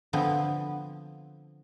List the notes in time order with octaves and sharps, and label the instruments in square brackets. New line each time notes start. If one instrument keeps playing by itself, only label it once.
[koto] D3 F3 B3 C4